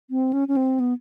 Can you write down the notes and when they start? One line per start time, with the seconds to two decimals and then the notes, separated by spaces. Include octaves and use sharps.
0.10 C4
0.33 C#4
0.48 C#4
0.57 C4
0.80 B3